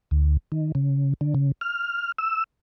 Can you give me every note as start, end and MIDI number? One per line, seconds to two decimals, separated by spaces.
0.11 0.37 38
0.52 0.72 51
0.75 1.14 49
1.21 1.34 50
1.35 1.52 49
1.61 2.12 89
2.18 2.44 88